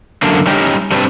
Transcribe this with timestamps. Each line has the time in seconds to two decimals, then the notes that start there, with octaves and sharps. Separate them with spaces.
0.22 F#2 D3 A#3 D4
0.47 G3 C#4 D#4 G4
0.92 G3 C4 D4 G4 B4